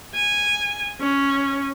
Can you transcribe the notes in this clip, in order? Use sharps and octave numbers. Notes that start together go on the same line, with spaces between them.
G#5
C#4